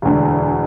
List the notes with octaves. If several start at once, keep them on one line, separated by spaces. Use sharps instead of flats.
E1 D2 D3